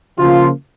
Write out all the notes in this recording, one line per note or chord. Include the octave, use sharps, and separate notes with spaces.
C#3 F3 A#3 F4